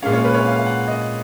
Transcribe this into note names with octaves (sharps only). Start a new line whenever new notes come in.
A#2 G#3 C#4 F5
C#5
B4
C#5
F5
F5
F#5
D#5